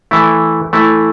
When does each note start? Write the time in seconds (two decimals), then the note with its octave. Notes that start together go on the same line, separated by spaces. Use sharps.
0.11 E3 A3 E4
0.73 E3 A3 E4